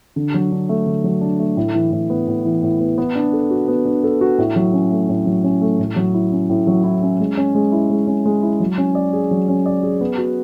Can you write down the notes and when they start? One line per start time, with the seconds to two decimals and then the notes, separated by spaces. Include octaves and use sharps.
0.16 D3
0.34 F#3
0.52 D4
0.69 A3
0.86 D3
1.04 F#3
1.21 D4
1.39 A3
1.57 A2
1.74 E3
1.92 A2
2.10 B3
2.28 A2
2.45 E3
2.63 A2
2.80 B3
2.98 B3
3.15 D4
3.33 A4
3.50 F#4
3.68 B3
3.85 D4
4.04 A4
4.21 F#4
4.38 A2
4.56 F#3
4.73 C#4
4.91 A3
5.09 A2
5.26 F#3
5.44 C#4
5.61 A3
5.79 A2
5.96 F#3
6.14 E4
6.32 C#4
6.49 A2
6.67 F#3
6.84 E4
7.02 C#4
7.20 G#3
7.37 C#4
7.55 G#3
7.72 E4
7.90 G#3
8.07 C#4
8.26 G#3
8.43 E4
8.60 F#3
8.78 C#4
8.95 D5
9.13 G#4
9.31 F#3
9.48 C#4
9.66 D5
9.83 G#4
10.01 B3
10.18 F#4